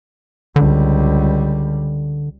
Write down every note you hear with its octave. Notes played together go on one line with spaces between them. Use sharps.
C#2 D3 G3